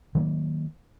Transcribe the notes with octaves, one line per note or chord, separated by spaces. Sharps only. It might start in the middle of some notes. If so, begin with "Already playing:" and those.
D#3 F#3 A3 A#3